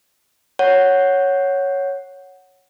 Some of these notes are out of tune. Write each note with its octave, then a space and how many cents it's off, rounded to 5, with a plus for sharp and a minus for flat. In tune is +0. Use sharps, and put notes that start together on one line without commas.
C#5 +0 F#5 +0